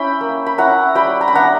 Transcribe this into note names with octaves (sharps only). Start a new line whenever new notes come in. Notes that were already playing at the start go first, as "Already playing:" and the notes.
Already playing: C#4 E4 G5 B5
A#3
B5
C#4 E4 F#5 A#5
G3 G5 B5
A#5
B5
B3 D4 F#5 A#5